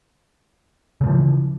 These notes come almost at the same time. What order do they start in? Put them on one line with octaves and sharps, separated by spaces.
C#3 A3 F3 E3